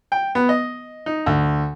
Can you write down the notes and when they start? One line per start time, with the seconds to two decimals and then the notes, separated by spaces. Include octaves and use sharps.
0.12 G5
0.35 B3
0.49 D#5
1.06 D#4
1.26 D2